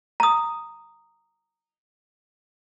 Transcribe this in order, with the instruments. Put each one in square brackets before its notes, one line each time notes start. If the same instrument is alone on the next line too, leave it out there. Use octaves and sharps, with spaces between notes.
[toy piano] A#5 D#6